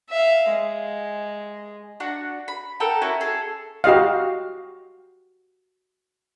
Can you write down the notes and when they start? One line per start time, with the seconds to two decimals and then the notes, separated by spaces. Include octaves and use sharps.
0.10 E5 F5
0.50 G#3
2.00 D4 F#4 F#5
2.48 B5
2.80 A4 A#4 F#5 G5
3.01 C#4 E4 F#4
3.21 G#4 A4
3.84 F#4 G4 D#5 F5